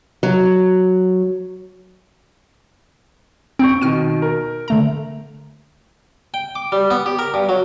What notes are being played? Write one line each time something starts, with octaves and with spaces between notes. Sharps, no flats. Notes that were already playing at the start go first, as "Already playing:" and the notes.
F#3
C4 C#6 G6 D7
B2 D#3 F6 D#7
A#4
D3 A3 A#5
G5
D6
G3
B3
G4
A#4
G2
F#3